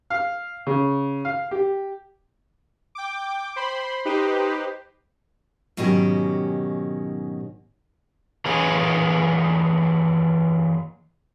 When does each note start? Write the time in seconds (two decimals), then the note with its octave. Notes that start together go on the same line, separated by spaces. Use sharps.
0.10 F5
0.67 C#3
1.25 F5
1.51 G4
2.95 G5 D6
3.56 C5 B5 C6
4.05 D#4 G4 B4 C5
5.77 G#2 B2 D#3 F#3 C#4 G4
8.46 E3 A#3 G#4 C#5